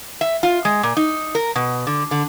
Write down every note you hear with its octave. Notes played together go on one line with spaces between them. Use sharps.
E5
F4
G#3
A#2
D#4
A#4
B2
D3
D3